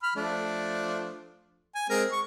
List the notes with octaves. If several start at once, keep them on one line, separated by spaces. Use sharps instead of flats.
B5 F6
F3 A3 D4
G#5
G#3 C4 A#4
C#6